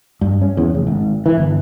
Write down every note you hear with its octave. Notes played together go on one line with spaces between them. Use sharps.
G2
C#4
E2
F1
G#1
E3
G1